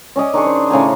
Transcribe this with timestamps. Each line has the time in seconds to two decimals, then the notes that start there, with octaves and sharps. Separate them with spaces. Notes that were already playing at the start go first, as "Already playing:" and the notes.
0.16 C#4 D5 D#5 G#5
0.34 D#3 D4 G#4 C#6
0.46 C5
0.70 A2 C#3 G#5 A#5